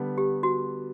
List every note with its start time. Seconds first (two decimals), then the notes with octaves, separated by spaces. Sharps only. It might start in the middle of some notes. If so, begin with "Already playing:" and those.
Already playing: D3 G3 B3
0.18 G4
0.43 F#4